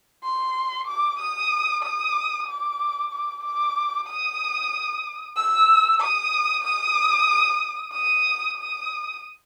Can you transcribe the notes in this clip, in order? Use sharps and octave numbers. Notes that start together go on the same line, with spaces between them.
C6
D6
D#6
D#6
D6
D6
D6
D#6
E6
D#6
D#6
D#6
D#6